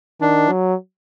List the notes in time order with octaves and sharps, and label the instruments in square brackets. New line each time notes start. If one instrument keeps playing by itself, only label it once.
[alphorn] D#3 [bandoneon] D4
[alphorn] F#3